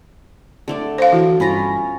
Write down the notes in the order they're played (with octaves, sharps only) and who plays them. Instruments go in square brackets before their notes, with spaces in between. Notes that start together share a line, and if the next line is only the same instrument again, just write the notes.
[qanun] D3 A3 D5
[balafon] C5 F5
[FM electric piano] E3 [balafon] F#4
[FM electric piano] G2 B5 A#6 [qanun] C#4 F4